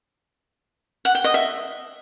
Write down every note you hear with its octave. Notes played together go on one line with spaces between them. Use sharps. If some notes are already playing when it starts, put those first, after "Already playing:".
F#5
G5
D#5
E5